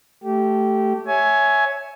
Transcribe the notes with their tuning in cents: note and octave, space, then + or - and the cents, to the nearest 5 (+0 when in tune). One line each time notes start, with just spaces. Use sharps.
A3 +0 G4 -15
C#5 +0 E5 +0 G#5 +15